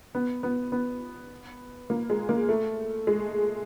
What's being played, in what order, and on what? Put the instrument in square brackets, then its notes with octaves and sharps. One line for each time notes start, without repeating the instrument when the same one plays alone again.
[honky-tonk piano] B3
B3
B3
A#3
G#3
A#3
A3
G#3